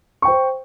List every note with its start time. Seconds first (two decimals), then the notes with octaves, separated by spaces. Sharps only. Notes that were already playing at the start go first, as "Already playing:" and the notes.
0.22 C#6
0.25 G5
0.28 C5